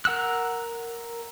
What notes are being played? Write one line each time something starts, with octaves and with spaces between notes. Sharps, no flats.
A#4 F#5 E6 F#6